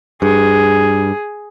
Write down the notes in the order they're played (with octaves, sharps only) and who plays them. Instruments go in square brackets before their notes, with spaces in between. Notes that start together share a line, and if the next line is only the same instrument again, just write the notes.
[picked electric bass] G2 [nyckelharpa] G#4